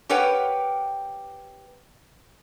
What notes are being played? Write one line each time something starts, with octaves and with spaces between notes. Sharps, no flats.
G4 A#4 B4 C#5 F#5 G5